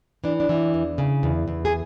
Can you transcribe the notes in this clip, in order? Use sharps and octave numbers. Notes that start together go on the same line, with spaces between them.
E3 D4
D4
E3
E2
C#3
E2
E2
G#4